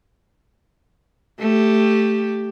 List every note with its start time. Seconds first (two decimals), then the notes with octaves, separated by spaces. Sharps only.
1.39 A3 G4